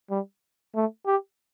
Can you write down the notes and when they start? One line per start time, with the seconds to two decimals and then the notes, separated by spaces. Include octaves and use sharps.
0.10 G3
0.75 A3
1.06 G4